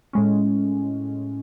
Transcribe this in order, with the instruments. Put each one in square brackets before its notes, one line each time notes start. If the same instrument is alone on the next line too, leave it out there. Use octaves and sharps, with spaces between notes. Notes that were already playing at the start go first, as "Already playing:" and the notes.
[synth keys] A2 G#3 C#4